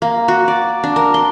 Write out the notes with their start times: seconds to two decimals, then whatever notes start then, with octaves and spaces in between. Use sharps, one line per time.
0.02 A#3
0.28 F#4
0.48 D5
0.84 D4
0.96 A#4
1.14 C6